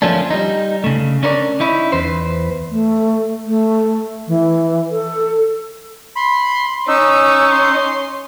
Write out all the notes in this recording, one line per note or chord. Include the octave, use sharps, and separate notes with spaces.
F3 A3 A#3 C#4 D4
G3 D#4
C#3 A3
C#4 D4 A#4 C5 D5
C#4 D#4 E4
E2 B4 C5
A3
A3
E3
A4
B5 C6
C#4 D#4 E6
C6